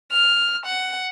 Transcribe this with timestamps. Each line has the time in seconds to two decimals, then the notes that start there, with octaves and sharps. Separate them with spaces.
0.12 F6
0.66 F#5